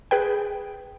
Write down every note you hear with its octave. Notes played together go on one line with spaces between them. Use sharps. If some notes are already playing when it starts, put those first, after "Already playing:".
G#4 B4 G5